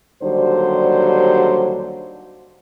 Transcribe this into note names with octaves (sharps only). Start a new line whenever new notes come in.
D#2 D3 F#3 G3 C5